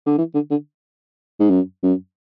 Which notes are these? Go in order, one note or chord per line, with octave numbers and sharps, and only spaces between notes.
D3
E3
D3
D3
G#2
F#2
F#2